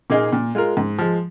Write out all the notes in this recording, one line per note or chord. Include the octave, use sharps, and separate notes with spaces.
A#2 A#3 D#4 G#4
A#2
G#3 F4 A#4
G#2
F3 G#3